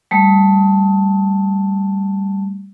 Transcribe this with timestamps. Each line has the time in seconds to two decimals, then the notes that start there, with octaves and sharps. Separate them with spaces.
0.11 G3 A3